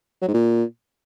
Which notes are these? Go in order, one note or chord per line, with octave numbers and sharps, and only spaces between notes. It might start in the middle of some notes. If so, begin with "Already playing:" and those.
F#3
G#2
A#2